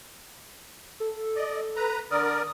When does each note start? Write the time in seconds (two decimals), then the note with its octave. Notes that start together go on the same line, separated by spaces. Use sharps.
1.00 A4
1.36 D5 D#5
1.76 B4 A#5
2.11 D3 A#4 D5 D#6